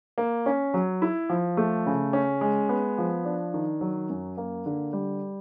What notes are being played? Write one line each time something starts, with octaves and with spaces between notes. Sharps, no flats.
A#3
C#4
F#3
E4
F3
A3
C#3
C#4
G#3
B3
F3
D4
D#3
F#3
F#2
A#3
D3
G3